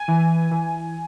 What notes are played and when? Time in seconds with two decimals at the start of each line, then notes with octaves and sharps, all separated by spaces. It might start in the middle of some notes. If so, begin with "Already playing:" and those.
Already playing: G#5
0.08 E3
0.51 E3